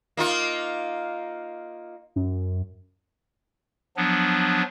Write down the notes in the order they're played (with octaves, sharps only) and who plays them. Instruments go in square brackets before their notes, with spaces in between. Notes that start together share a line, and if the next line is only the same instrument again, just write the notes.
[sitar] A#3 D#4 F4
[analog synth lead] F#2
[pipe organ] F3 F#3 B3 D4